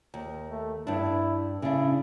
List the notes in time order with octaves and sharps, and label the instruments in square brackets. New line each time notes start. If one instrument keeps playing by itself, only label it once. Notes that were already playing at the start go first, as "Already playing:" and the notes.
[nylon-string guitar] D#2
[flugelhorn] A3
[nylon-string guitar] G2 D4 [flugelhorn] E4
[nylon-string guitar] C#3 D4 [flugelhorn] E4